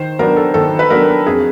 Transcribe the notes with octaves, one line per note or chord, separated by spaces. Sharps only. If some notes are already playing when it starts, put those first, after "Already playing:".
Already playing: D#3 C5
F#3 B3 D4 A#4
A4
D#3 A4
B4
F#3 B3 D4 A#4
F2 G#4